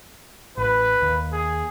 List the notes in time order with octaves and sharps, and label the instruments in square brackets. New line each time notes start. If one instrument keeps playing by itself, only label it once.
[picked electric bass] A1 [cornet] B4
[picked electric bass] D#2
[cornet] G#4